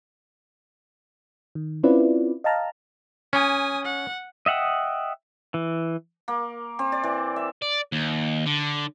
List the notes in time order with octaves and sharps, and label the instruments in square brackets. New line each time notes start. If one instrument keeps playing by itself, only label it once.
[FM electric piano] D#3
C4 C#4 E4 F4 B4 D5
D#5 F5 G5 A5 A#5 F6
[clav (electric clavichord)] C#4 [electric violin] G#5 D#6
[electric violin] F#5
[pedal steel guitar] D#5 E5 F#5 G5 D#6
E3
[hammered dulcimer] A#3
C4
D5
E3
E5
[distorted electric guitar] D5
D#2
D3